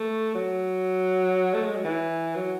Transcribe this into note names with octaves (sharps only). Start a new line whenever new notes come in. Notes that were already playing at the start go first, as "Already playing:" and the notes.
Already playing: A3
F#3
A3
G#3
F#3
E3
F#3